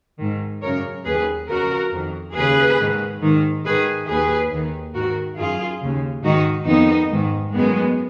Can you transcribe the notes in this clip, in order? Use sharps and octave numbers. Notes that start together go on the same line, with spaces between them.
G#2 D#3
F#2 C#3 A#4 C#5
D#2 D#3 G#4 B4
F2 C#3 F#4 A#4
F2 D#3
D#2 C#3 G#4 B4
G#2 D#3
G#2 D#3
G#2 D#3 G#4 B4
D#2 D#3 G#4 B4
D#2 D#3
G#2 D#3 F#4 A#4
F#2 D#3 F4 G#4
D#2 C#3
G#2 D#3 D#4 F#4
F2 D#3 B3 D#4
G#2 D#3
F#2 D#3 G#3 B3